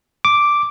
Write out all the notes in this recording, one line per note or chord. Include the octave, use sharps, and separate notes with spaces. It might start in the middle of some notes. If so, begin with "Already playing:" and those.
D6